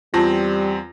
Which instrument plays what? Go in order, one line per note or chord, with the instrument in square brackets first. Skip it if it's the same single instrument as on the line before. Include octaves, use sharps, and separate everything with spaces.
[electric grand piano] E2 C4 A#6 [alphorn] G3 [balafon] F4 A5